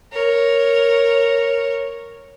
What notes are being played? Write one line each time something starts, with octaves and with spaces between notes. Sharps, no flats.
A#4 C#5